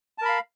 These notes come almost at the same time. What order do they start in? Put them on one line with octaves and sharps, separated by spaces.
A5 A#4 B5 F5